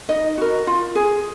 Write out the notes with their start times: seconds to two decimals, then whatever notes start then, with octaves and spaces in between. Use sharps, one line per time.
0.09 D#4 D#5
0.38 F#4 A#4
0.67 F4
0.95 G#4